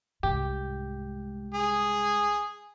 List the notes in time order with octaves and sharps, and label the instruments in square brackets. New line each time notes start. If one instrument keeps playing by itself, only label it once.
[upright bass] C2 G#2 [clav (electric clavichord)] G4
[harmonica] G#4